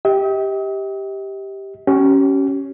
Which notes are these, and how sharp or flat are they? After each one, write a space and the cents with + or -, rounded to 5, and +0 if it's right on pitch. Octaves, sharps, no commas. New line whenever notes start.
G4 +0 D#5 +45
C#4 +0 G4 -40